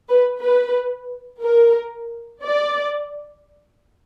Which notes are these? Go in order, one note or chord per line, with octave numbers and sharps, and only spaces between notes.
B4
B4
A#4
D5